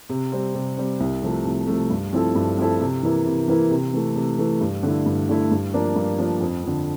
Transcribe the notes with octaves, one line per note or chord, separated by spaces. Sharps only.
C3
G3 C4
C3
G3 C4
C2
C3 F3 A3
C2
C3 F3 A3
G2
F3 C4 E4 A4
G2
F3 C4 E4 A4
C3
E3 A#3 E4
C3
E3 A#3 E4
C3
E3 A3
C3
E3 A3
G2
D3 A3 E4
G2
D3 A3 E4
G2
F3 A#3 D4
G2
F3 A#3 D4
F2
D3 F3